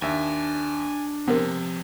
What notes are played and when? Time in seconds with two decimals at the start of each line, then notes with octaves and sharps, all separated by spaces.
0.02 D#2 D4 E5 G#5
1.28 C3 F3 G#3 B3 A#4